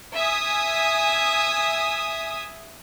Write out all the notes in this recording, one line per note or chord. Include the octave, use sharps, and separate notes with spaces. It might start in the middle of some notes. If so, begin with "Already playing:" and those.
E5 G#5 D#6